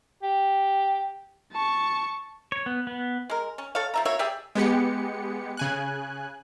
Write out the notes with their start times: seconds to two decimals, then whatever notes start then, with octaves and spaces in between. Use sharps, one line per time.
0.23 G4
1.53 A5 C#6
2.52 C#5
2.66 B3
2.87 B3
3.30 G#3 A#4
3.58 C#4
3.75 A4 C#5 F5
3.94 F3 E5 A#5
4.05 A#3 F#4 C#5 E5
4.19 G4 G#4 D5 E5
4.55 G#3 B3 G4 C#7
5.57 C#3 G#5 F#6